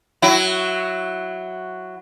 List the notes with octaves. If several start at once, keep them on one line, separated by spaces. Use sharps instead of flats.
F#3 E4